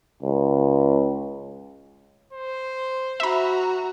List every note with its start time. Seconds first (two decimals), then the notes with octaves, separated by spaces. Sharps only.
0.23 C#2
2.33 C5
3.20 F#4 E5 A#5 B5